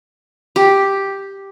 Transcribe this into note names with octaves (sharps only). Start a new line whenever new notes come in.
G4